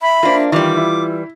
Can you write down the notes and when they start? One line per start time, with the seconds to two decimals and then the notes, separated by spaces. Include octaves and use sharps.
0.02 E5 B5
0.23 A#3 D4 F4 C5
0.52 D#3 E3 G3 F4 D6
0.77 E4